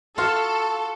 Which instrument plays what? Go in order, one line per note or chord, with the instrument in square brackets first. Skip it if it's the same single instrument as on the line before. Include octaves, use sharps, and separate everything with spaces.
[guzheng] F4 F#4 F5 [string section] A4